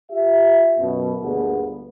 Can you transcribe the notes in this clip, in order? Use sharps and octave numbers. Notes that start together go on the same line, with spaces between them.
F4 G4 E5
F#2 B2
G1 D2 A#2 B3 G#4